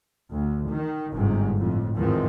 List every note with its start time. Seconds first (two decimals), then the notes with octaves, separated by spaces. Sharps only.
0.32 D2
0.71 D#3
1.14 G1 G#2 C3
1.58 F2 A2
1.96 E2 G#2 D#3 F3 C4